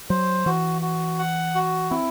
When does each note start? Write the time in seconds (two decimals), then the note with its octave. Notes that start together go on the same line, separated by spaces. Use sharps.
0.10 F#3 C5
0.46 E3 F#4
0.82 F#4
1.19 F#5
1.55 F#4
1.90 C4 E4